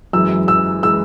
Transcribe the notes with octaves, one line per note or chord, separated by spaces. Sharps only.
F#2 E3 G#3 E6
E6
E3 G#3 E6